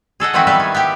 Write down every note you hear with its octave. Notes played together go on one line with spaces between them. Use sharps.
G#4 A4 D#5 F#5
D#3 F3 B3 C4 E4 F#4
G3 B3 A4 B4
G#5
B3 G4